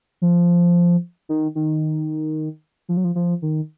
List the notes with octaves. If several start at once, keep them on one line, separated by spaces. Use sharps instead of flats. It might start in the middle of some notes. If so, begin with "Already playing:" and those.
F3
D#3
D#3
F3
F#3
F3
F3
D#3